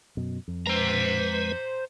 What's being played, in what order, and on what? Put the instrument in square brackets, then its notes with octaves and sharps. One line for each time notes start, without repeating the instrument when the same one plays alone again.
[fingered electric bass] F#2 B2
F2
[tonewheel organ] G#3 B4 [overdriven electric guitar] C5 A#5